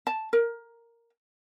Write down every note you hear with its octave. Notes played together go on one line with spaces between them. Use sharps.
A5
A#4